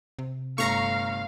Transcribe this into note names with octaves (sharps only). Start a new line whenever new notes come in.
C3
G1 A3 F5 A#5 C#6